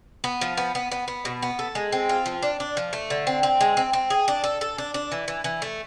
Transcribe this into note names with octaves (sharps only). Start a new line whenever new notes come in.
B3
F3
B3
B3
B3
B3
B2
B3
A4
G#3
C4
F4
F3
D4
D4
F3
A3
D3
C4
C4
G#3
C4
C4
G#4
D4
A4
A4
D4
D4
E3
E3
E3
A3